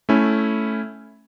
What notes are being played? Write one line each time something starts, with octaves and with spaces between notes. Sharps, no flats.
A3 C#4 E4